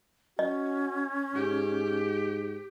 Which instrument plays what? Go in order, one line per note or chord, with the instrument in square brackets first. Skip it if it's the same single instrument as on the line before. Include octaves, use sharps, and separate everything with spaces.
[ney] C#4 [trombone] F#4 [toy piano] D#5
[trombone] G#2 [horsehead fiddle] G4